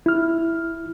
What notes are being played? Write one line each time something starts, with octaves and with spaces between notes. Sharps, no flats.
E4 F6